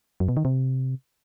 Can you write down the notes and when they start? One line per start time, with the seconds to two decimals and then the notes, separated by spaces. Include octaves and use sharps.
0.20 F#2
0.29 B2
0.37 D#3
0.45 C3